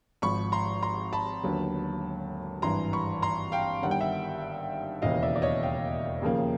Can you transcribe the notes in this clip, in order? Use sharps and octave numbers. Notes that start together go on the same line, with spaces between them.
G#1 G#2 F3 B5 C#6
A#5 C6
A#5 C6
A5 B5
D#2 D3 F#3 B3
G#1 G2 E3 A#5 C6
B5 C#6
A#5 C6
F5 G5
G1 G2 D#3 G3 F#5
G5
E5 F#5
E1 D#2 C#3 E3 D#5 F5
D5 E5
D5
C#5 D#5
F5 G5
D#2 C#3 F3 A#3